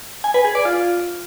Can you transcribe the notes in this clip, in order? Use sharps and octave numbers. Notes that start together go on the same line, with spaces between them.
G#5
B4
G#4
D5
F4